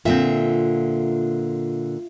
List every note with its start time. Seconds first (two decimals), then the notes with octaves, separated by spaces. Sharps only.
0.05 A#2 D3 C4 F4 E5